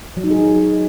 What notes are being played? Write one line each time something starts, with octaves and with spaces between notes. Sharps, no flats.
F#3
D#4
G#4